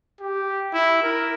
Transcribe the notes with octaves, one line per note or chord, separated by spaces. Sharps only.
G4
E4
A#4